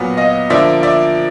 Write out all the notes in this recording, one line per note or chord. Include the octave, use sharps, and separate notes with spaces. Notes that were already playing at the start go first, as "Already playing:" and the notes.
Already playing: A#2 F#3 B3 F5
D#5 F5
D3 F3 A#3 D5 E5
D5 E5